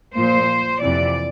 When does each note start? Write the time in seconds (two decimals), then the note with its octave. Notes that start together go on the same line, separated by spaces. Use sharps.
0.15 A#2 F3 A#3 C5
0.81 F2 C3 E3 D5